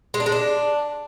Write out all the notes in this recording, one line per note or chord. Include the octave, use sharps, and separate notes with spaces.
G#3
D4
G#3
D4